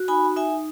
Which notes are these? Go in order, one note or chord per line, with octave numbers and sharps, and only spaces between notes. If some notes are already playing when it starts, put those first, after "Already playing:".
Already playing: F#4
D#4 G#5 B5
D#4 E5 G#5